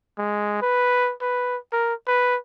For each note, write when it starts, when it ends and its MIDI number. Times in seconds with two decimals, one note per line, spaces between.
0.18 0.59 56
0.62 1.13 71
1.21 1.57 71
1.73 1.94 70
2.07 2.37 71